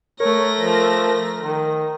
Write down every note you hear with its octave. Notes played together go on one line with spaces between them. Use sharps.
A3 A#4 C#5 A#6
F3
D#3